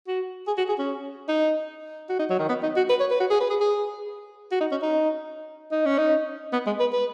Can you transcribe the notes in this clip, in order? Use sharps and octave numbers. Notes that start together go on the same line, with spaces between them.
F#4
G#4
F#4
G#4
C#4
D#4
F#4
D#4
F#3
D#3
B3
D#4
F#4
B4
C#5
B4
F#4
G#4
B4
G#4
G#4
F#4
D#4
C#4
D#4
D#4
C#4
D#4
B3
G#3
B4
B4